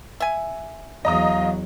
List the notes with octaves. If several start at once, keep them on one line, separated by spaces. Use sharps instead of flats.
E5 G#5
E2 F#3 D#5 F5 A#5 D#6